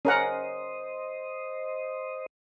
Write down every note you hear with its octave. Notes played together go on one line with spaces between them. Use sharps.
C#4 A#4 C5 D#5 F#5